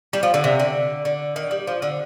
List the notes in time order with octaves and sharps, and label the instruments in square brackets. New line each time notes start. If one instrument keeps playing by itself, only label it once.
[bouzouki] G3
F3
D3
C3
D3
D3
D#3
G3
F3
D3